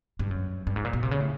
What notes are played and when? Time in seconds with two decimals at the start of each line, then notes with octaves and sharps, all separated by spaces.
0.19 G2
0.31 F#2
0.67 G2
0.76 G#2
0.85 A#2
0.93 B2
1.03 C3
1.11 C#3
1.20 A2